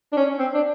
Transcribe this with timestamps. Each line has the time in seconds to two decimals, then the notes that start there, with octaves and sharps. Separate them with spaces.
0.12 D4
0.16 C#4
0.39 C4
0.54 D4